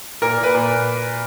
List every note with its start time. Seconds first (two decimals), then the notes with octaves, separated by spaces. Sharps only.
0.21 A#2 A#4
0.37 A#2
0.43 B4
0.54 A#2